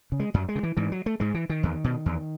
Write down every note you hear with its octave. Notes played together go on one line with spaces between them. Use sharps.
C#3
G#3
F#2 F#3
G#3
C#3
E3
G#2 E3
F#3
A3
G#2 G#3
E3
D#3
E2
B2
E2